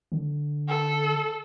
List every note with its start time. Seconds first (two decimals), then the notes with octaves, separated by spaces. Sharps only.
0.12 D3
0.68 A4